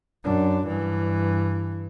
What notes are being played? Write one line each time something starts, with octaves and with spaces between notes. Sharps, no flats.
F#2 D4
G2 E3